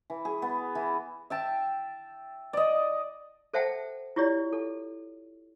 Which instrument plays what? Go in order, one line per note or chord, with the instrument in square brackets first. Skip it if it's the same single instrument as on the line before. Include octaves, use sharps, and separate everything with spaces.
[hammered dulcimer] E3
G#4
B3
E3
E5 G5 A5
D5 D#5
[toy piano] A4 C5 E5 F#5 G5 A5
E4 F4 G4 C#5 D5
A4